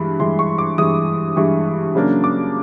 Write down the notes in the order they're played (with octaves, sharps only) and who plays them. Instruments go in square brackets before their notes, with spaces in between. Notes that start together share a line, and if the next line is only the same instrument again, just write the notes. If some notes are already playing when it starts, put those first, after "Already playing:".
Already playing: [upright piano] G2 E3 G#3 B5
G2 E3 G#3 C6
C#6
D6
G2 E3 G#3 D#6
G2 E3 G#3 C#6
C#3 F#3 A#3 D4
D6